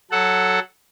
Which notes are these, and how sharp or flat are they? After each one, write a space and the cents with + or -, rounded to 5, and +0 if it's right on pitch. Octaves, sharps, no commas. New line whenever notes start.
F#3 +0 A4 +0 F#5 +0